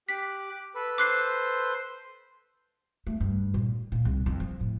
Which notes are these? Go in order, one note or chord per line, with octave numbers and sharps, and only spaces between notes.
G4 D6 F#6 B6
A4 B4 B5
C5 C6 D6 F#6 C7
A3
G2
A#2
A#2
C2
F2
F3
A2